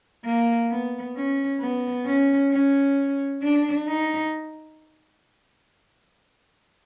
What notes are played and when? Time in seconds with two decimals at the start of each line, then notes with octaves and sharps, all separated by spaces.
0.25 A#3
0.71 B3
1.16 C#4
1.61 B3
2.06 C#4
2.51 C#4
3.42 D4
3.88 D#4